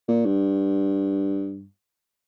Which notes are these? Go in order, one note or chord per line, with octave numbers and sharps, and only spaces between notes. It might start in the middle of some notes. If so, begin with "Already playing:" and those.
A#2
G2